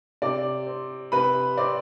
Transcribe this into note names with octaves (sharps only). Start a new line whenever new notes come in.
C3 D5 D6
C4
C3 B4 B5
C4 D5 D6